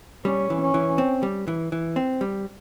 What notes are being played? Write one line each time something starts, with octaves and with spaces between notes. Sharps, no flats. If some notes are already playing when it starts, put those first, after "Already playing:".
G3 C#4
E3
C#4
E3
C4
G3
E3
E3
C4
G3